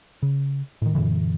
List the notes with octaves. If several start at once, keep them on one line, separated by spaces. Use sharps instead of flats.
C#3
A2 D#3
F#2 A#2 D3 E3